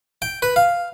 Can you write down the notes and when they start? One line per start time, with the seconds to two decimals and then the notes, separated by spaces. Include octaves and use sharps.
0.22 G5
0.42 B4
0.56 F5